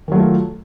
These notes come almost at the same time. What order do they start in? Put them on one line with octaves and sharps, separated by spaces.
D#3 F#3 A3 F4